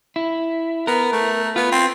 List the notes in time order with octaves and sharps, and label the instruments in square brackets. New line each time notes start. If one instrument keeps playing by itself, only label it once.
[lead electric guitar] E4
[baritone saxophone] B3 [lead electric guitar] A#4
[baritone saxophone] A3
[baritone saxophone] B3 [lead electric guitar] F4
[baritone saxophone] C4